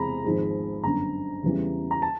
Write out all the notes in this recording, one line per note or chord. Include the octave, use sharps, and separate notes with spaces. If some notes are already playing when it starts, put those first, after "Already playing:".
Already playing: E2 C3 E3 G#3 A#5 B5
G#1 G#2 F3 G#3
G1 F#2 D3 A#5
E2 C#3 E3 G3
A#5
A5